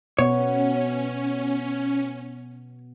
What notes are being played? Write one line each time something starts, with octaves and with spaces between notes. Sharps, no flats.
B2 B3 C#4 C#5